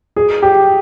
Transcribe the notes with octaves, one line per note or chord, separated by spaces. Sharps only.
G#4
G4